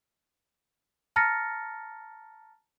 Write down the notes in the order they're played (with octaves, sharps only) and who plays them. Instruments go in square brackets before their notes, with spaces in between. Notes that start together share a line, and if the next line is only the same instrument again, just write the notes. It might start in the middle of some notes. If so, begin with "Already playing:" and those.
[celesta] A5 A#5 F6 A6 A#6 C#7